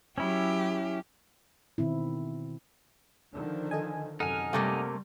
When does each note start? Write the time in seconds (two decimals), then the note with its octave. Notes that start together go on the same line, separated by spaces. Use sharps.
0.18 F#3 C#4 E4 G4
1.78 B2 D#3 C4 E4
3.32 D3 D#3 F3
3.71 A4 D#5 G#5
4.20 F#2 C3 D#4 A4 F#5 G#5 F6
4.53 C3 G3 A3 A#3